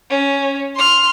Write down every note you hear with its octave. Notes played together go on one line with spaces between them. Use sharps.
C#4
C6 F6